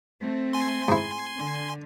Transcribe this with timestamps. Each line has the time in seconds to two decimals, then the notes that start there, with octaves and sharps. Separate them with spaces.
0.21 A3 C4
0.53 G#5 C6
0.88 G#2 E4
1.37 D3